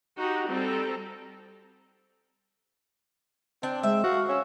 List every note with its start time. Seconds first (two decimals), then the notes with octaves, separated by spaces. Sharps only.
0.17 D#4 F#4 G4
0.48 G3 C4 A4 A#5
3.63 C4 D4
3.83 G#3 E5
4.04 F#4 F5
4.29 C#4 E6